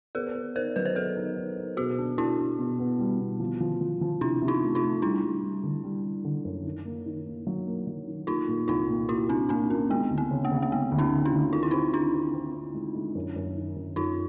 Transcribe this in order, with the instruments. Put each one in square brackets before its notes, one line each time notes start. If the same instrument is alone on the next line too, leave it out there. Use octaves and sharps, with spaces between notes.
[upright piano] B3 [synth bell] G#4 A#4
[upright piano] B3
[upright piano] D#4 [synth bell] A#4 C5
[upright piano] F#3 [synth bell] B4
[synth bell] C5
[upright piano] B3 [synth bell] A4 B4
[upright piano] D#4
D#4
D#4
[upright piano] B2 [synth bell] F#4 G#4
[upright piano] D4
[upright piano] D4 [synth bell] E4 F#4
[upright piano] D4
B2
B3
G3
B2
F3
F3
F3
F3
[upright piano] C3 [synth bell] D4 E4
[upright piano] C3
[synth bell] D#4 F4
[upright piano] A3
[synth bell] D#4 F4
[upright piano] A3
[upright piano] G3 [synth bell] D4 E4
[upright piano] G3
G3
D3
G3
G3
D3
F#2
D#3
A#3
D#3
A#3
F#3
A#3
F#3
D#3
[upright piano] A#3 [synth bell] D#4 F4
[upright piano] A#2
[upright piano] C2 [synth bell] D#4 F4
[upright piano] A#2
[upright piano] A#2 [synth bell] E4 F#4
[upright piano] C2 [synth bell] C4 D4
[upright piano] A#2 [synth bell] C4 D4
[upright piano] A#3 [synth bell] C#4
[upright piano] G#3 [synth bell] B3
[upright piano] D2
[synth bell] C4
[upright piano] C#3
[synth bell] A#3
[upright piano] C#3
[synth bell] A#3
[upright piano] G#3 [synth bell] B3
[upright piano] D2
[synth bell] C#4 D#4
[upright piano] D2
[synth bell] D4 E4
[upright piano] D2
[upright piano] D#3 [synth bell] F4
[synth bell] E4
[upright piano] C4 [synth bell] D#4 F4
[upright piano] D#3 [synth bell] D4 E4
[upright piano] C4
C4
C4
G#3
G#3
F#2
F#2
D#3
F#2
[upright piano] F#2 [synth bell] D#4 F4